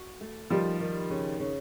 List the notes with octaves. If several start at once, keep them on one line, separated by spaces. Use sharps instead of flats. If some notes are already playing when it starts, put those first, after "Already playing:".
Already playing: F#4
A3
D#3 F3 G3
D#3
C#3
C#3